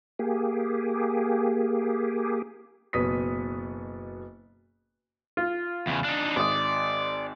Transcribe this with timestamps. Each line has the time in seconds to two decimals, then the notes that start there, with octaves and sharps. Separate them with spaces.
0.19 A#3 G4 G#4
2.93 F#1 B2 B3 D#6 B6
5.37 F4
5.87 E2 C#3
6.04 D4 D#4
6.36 G#1 D5 D#6